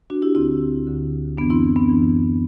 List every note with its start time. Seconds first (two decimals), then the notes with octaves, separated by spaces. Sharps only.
0.10 D4 F#4
0.22 E4 G4
0.35 D2 D3 C4 E4
0.87 D2 D3
1.37 F#2 E3 B3 D4
1.50 C4 E4
1.76 B3 D4
1.89 F#2 E3